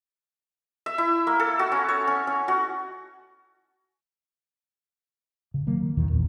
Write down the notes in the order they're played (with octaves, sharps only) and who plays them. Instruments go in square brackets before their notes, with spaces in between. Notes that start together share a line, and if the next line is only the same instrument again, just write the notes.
[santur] E5
E4
A#3
A4
F#4
C#4
C#5
C#4
C#4
F#4
[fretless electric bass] C#3
D#3 F#3 A3 A#3
D#3
D#2 B2 D#3 E3
D#1 A#1 E2